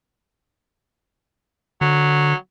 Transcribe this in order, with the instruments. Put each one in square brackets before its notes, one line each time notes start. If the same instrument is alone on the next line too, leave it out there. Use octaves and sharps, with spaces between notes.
[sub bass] D3 [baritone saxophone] F#3